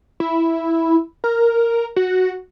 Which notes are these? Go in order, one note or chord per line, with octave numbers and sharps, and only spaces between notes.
E4
A#4
F#4